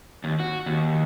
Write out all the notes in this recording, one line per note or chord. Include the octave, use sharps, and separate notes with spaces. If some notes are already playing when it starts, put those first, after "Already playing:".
D#2
F#4
D#2